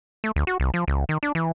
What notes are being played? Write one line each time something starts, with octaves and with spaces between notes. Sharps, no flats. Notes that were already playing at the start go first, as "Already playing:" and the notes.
A3
D2
F#4
C2
F3
C#2
D#3
D4
E3